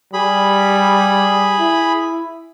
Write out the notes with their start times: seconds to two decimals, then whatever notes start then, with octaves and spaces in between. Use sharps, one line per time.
0.13 G3 G#4 B5
1.60 E4